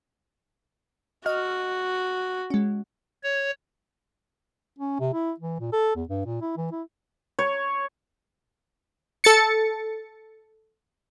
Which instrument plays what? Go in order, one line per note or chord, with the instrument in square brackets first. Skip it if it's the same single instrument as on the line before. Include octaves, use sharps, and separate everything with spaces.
[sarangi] F#4 [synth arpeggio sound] D#5 F6
[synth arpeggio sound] G#3 C#4
[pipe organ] C#5
[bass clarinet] C#4
C3
E4
E3
A#2
A4
E2
G2
A#2
E4
E3
E4
[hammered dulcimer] C#5
[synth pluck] A4 A6 C#7